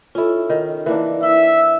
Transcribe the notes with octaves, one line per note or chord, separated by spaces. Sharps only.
C#4 E4 F4 A4
D#3
E3 A#3 D4
E4 E5